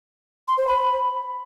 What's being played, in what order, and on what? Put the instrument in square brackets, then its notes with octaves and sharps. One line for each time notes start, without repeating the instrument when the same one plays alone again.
[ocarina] C6
C5
B5